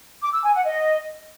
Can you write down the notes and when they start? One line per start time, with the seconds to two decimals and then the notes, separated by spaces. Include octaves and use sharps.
0.22 D6
0.33 E6
0.44 G#5
0.54 F#5
0.65 D#5